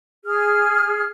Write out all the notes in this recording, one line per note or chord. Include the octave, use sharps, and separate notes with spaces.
G#4 F6